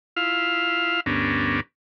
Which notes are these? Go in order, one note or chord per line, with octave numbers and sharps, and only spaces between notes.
E4 F4 F5
D2 G2 B3 C#4 D4 A#4